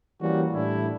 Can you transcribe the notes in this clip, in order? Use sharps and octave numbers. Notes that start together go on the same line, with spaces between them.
E3 G3 A#3 C#4 F#4
A2 G3 D4 E4